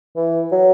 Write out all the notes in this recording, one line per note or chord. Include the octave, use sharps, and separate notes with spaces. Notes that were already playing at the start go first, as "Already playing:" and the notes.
E3
F#3